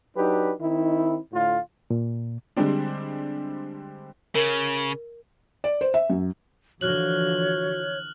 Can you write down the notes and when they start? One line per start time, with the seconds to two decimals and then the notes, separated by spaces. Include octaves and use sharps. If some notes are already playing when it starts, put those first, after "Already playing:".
0.16 F#3 D4 D#4 G4 B4
0.61 D#3 C4 D#4 E4
1.33 A2 D3 F4
1.90 A#2
2.56 D3 G3 G#3 C4 D4
4.35 C#3 A#4
5.64 D5
5.81 C5
5.94 E5
6.10 F#2
6.81 D3 E3 F3 F#4 C#5 F6 F#6 F#7